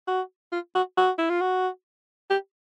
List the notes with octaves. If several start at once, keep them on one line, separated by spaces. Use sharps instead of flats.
F#4
F4
F#4
F#4
E4
F4
F#4
G4